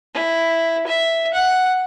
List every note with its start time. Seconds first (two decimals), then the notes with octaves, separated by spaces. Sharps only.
0.14 E4
0.87 E5
1.34 F#5